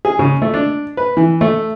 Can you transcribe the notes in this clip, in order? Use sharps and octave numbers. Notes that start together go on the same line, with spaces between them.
G#4
C#3
A3
D4
B4
E3
A3